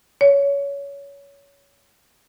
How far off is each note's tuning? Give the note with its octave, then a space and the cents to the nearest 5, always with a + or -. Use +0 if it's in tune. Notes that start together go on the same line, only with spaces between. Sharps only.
C#5 +20